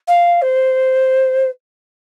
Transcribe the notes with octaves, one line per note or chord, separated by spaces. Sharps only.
F5
C5